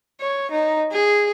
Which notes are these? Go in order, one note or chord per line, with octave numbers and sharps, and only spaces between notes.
C#5
D#4
G#4